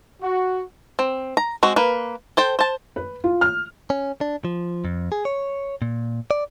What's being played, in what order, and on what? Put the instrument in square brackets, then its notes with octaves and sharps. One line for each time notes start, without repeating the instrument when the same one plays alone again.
[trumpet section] F#4
[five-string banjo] C4
A#5
G#3 C4 F#4
A#3 B4
A4 C5 G5
C5 A5
[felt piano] B4
F4
F6
[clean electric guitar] C#4
D4
F3
F2
G#4
C#5
A#2
D5